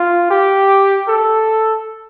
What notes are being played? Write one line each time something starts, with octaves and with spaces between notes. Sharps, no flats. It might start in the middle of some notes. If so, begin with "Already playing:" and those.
Already playing: F4
G4
A4